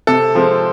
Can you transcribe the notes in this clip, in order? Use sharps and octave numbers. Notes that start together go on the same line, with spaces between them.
C3 A4
F3 G#3 C4